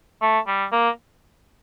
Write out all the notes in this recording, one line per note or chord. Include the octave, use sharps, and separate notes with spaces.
A3
G3
A#3